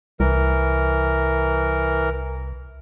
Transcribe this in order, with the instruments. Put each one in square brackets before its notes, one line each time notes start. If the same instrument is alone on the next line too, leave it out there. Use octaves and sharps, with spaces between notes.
[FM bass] C2 [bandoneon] E3 A#4